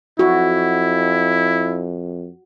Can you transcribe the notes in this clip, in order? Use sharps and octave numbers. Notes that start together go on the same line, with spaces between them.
F2 E4 F#4